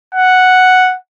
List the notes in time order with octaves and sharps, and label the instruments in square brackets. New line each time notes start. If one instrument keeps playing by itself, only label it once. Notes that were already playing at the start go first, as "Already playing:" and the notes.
[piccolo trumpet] F#5